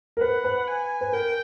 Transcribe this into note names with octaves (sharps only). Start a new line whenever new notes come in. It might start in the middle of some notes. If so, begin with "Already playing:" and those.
A#4
B4 F#5
B4
G#5
B4
A#4 G5